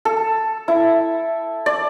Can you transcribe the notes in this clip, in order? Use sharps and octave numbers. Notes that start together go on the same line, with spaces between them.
A4
E4
D5